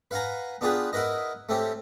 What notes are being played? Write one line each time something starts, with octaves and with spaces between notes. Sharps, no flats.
B4 F5 F#5 G#5 A#5
B3 D4 F4 G4 G#4 B4
E4 F#4 A#4 B4 D#5
A3 C4 C#4 G4